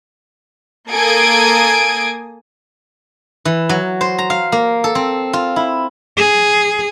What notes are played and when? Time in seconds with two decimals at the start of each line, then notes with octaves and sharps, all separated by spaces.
0.90 A#3 A4 G#5 D#6 G#6 D7
3.45 E3
3.69 F#3
4.01 C5
4.18 A#5
4.30 F5
4.52 A#3
4.84 A4
4.95 C4
5.33 F4
5.56 E4
6.17 G#4